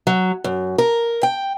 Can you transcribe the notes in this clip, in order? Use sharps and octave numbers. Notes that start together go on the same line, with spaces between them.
F#3
F#2
A#4
G5